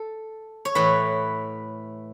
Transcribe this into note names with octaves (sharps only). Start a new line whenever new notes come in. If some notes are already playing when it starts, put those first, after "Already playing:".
Already playing: A4
C#5
A2 E3 B4